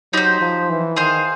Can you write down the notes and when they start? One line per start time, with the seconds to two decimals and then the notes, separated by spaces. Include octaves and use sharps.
0.13 F#3 D#4 G4 C5
0.41 F3
0.70 E3
0.96 D#3 G#4 C5 F5